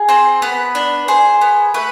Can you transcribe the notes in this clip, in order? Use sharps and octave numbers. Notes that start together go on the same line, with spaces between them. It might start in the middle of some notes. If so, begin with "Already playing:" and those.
Already playing: G#4
C4 C5
B3 B4
D4
G#4 C5
B3
A3 B4